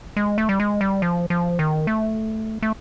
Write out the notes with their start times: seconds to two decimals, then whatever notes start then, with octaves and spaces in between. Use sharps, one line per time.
0.17 G#3
0.38 A3
0.49 G3
0.60 G#3
0.81 G3
1.02 F3
1.30 F3
1.59 D#3
1.87 A3
2.62 A3